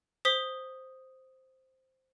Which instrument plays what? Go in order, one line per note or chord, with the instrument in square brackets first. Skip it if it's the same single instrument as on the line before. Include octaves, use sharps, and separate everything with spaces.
[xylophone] C5 D#6 B6 G7